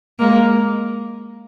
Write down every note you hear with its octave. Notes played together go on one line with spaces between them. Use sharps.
G#3 A#3